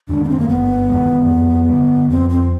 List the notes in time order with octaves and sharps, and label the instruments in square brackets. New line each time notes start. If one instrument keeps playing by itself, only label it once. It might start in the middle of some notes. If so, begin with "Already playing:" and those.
[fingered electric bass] F#2 D#3 G#3 [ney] D4
[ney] B3
C4
A#3
[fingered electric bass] G1 [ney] B3
[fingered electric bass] F#2 D#3 G#3
F2
D3 G3
[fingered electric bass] F2 [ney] C4
[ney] C4